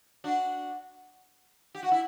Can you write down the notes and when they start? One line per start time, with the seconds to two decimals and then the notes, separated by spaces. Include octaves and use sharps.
0.24 D4 F#4
1.75 G4
1.83 F#4
1.91 E4